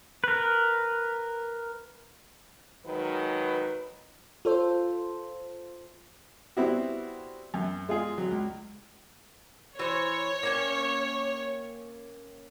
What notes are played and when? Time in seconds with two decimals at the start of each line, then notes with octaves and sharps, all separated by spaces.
0.24 A#4 B4
2.87 D#3 F#3 G#3 B4
4.45 F4 A4 C5
6.57 G3 B3 C4 E4 F#4
7.54 F#2
7.89 G#3 F4 G#4
8.18 F#3
8.31 C#2
9.79 E3 C5 C#5
10.43 A#3 C#4 G5